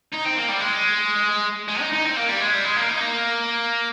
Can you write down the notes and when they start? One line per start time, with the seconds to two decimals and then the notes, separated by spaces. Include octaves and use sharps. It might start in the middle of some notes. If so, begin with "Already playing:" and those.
0.13 D#4
0.25 C4
0.36 A#3
0.48 G3
0.60 G#3
1.68 G#3
1.81 D#4
1.93 D#4
2.05 C4
2.17 A#3
2.29 G3
2.41 G#3
2.53 G3
2.64 G#3
2.77 A#3
2.89 D#4
3.01 A#3